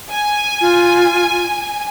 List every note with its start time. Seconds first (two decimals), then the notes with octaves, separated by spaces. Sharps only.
0.11 G#5
0.61 F4